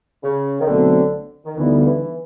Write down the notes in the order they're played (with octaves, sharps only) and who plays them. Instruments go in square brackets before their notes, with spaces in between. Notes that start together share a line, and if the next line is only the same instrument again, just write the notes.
[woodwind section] C#3
D#3
[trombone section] B1 B2 F#3 A3 C4 [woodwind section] D3
[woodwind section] D#3
[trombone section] D2 D3 G3 B3 D#4 [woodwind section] E3
[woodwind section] F3
E3